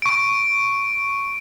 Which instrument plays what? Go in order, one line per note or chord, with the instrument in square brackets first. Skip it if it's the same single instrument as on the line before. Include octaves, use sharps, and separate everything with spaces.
[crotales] C#6 D7